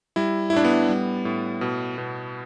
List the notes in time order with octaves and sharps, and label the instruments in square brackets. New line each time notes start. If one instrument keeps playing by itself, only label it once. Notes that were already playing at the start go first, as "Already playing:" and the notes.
[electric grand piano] G3 E4
E4
A2 D4
B3
G3
A2
B2
B2